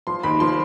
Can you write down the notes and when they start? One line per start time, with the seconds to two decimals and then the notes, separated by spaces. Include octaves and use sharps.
0.07 F3 C6
0.23 D#2 B5
0.40 F3 C6